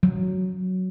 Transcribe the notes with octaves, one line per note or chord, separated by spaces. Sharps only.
F#3